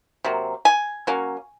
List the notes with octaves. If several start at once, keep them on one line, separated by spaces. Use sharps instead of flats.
C3 F#3 A#3
G#5
F#3 A#3 C#4